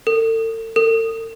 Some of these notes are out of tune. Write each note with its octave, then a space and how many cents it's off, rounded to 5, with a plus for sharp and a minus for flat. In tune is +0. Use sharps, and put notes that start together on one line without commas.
A4 +40
A4 +45